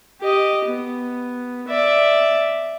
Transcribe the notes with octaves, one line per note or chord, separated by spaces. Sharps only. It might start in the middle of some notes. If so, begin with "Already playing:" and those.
G4 D#5
B3
D5 E5